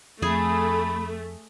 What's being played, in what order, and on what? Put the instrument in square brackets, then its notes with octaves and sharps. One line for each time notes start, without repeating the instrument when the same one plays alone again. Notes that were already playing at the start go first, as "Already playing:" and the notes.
[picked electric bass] F2 [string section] A3 [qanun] G#4 [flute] B5